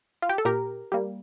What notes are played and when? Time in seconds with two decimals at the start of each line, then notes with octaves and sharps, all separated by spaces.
0.22 F4
0.29 G4
0.38 A4
0.45 A#2 G4 A#4
0.92 G3 A#3